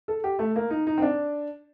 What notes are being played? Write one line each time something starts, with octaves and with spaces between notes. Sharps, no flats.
A4
G4
A3
A#3
D#4
D#4
C4
D4